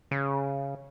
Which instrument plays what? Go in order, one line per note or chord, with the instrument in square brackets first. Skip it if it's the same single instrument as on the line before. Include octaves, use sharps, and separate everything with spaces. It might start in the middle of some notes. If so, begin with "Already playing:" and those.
[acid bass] C#3